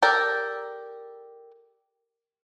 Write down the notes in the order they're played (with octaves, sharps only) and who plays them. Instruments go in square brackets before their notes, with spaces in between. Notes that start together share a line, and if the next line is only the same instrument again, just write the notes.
[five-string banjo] G4 A4 A#4 D5